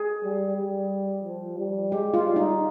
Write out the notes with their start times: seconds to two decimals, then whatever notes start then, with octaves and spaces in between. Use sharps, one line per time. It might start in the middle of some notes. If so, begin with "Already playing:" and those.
Already playing: G#4
0.24 G3
0.58 G3
1.24 F3
1.58 G3
1.91 G#3 G4
2.14 F4
2.26 G3
2.36 D#4